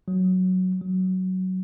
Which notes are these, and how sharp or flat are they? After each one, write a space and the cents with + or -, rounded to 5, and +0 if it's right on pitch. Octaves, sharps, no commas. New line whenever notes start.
F#3 +0
F#3 +10